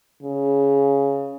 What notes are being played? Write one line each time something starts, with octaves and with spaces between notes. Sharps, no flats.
C#3